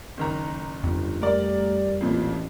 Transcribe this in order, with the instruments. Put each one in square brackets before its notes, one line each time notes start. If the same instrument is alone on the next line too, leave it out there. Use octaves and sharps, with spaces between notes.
[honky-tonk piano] F#1 D#3 A#5
[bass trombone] G1 [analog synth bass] F2
[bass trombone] G3 [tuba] A3 [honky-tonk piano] A#4 D5
[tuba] A1 [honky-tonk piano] F2 A#2